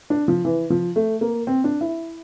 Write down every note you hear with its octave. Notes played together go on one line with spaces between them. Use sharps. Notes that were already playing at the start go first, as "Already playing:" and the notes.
D4
F3
E3
F3
A3
A#3
C4
D4
E4